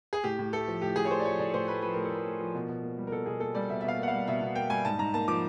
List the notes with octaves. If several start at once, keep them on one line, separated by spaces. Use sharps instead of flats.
G#4
A2 G4
A2
A3 A4
F3
A2 G4
A2 G#4
C#5
A3 C5
D5
F3 C#5
A2 D5
A2 C5
A3 B4
F3 B4
A2 A#4
A4
A2 A#4
A3
F3
B2
B2
A#3
G3
A#4
B2 A4
B2 G#4
A#3 A4
G3 D5
B2 E5
E5
B2 F5
A#3 F#5
F5
G3
B2 E5
B2
A#3 G5
G3 G#5
G#2 A5
G#2 A#5
A#3 A5
F3 D6